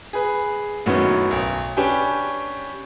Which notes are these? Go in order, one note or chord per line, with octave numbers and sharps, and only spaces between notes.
G#4 B4
F#2 A2 D#3 F#3 B3 C#4
B1
C#4 D4 G4 B4 G5 G#5